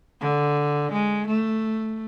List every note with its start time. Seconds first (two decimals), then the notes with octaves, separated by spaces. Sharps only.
0.21 D3
0.92 G#3
1.27 A3